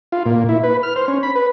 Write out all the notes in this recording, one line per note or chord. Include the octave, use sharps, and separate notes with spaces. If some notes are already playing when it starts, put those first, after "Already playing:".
F4
A#2
E4
B4
F6
C5
C#4
B5
B4